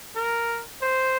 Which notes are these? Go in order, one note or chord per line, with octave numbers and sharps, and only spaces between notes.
A#4
C5